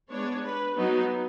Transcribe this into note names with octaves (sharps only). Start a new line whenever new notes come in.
G#3 B3 D4 C#5
B4
F#3 B3 D#4 F#4